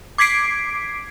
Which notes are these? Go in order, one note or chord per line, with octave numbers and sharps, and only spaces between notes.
D6 G#6 B6 C7 D7